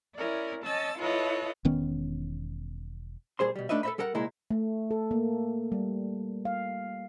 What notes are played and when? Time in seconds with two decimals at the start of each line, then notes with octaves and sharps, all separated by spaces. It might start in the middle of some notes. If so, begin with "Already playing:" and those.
0.16 C#4 E4 A#4 D5
0.64 C#4 D#5 A5 E6 A6
0.98 E4 F4 A4 B4 C#5 D#5
1.65 E1 D#3 B3 C#4
3.39 A#2 G3 G#4 C5 C6
3.56 B2 G3
3.69 A3 D4 D#4 B4 D#5 E5
3.83 A4 B4 C5 D#5 E5 B5
3.98 G3 A4 A#4 F#5
4.15 C2 A#2 G#3 E4 A#5
4.51 A3
4.91 A4
5.11 A#3
5.72 G3
6.45 F5